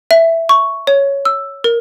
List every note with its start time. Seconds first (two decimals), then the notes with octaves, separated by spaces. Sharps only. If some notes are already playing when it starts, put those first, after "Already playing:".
0.11 E5
0.49 C#6
0.87 C#5
1.25 E6
1.64 A#4